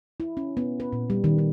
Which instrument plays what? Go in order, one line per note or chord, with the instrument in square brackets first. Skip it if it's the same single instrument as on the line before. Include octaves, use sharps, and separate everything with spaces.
[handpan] E4
C#4
B3
B4
A#2
G3
D#3
D#4